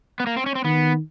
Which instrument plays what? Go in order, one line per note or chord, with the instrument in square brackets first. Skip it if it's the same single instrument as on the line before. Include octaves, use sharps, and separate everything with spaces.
[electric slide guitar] B3
A#3
C4
C#4
C4
[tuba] D#3 [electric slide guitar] B3